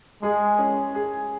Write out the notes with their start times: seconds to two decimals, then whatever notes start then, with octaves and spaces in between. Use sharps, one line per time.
0.22 G#3 G#4
0.59 C#4
0.95 G#4